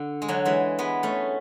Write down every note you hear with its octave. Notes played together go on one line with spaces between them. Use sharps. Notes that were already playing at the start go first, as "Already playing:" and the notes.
Already playing: D3
G#3
D3 F#3
E3 G#3
G#3 B3
A3 C#4